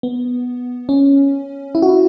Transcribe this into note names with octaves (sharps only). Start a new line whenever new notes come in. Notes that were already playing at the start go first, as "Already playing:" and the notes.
B3
C#4
E4
F#4
E4